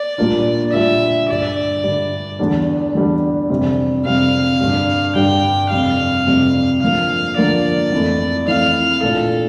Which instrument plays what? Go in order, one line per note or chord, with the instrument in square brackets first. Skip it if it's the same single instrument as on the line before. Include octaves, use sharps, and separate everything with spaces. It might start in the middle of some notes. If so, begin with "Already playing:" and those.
Already playing: [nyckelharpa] D5
[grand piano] A#2 G3 A#3 D4 F4
[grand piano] A#2 G3 A#3 D4 F4 [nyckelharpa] E5
[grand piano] G2 D3 G3 [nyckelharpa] D5
[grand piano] G2 D3 G3
E2 D3 G3 D4
E2 D3 G3 D4
F2 C3 G3 C4
[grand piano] F2 C3 G3 C4 [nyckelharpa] F5
[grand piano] G2 D3 G3
[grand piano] G2 D3 G3 [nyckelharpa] G5
[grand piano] F2 C3 G3 [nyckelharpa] F5
[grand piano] F2 C3 G3
[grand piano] D3 F3 A#3 [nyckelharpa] F5
[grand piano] D3 F3 A#3 [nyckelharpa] D5
[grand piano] F2 E3 A3 E4
[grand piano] F2 E3 A3 E4 [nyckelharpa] F5
[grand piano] A#2 A3 D4 F4 [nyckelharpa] A4